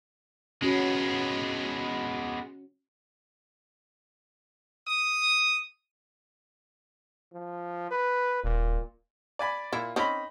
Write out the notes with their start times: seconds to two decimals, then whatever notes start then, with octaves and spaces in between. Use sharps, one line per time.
0.62 G#3 B3 C#4 F#4
4.88 D#6
7.33 F3
7.91 B4
8.43 D#1 A#2
9.39 D5 G#5 B5
9.73 A#2 E4
9.96 C4 C#4 D#4 B5